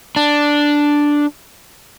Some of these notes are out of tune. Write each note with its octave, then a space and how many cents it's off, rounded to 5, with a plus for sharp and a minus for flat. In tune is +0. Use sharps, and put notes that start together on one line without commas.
D4 +0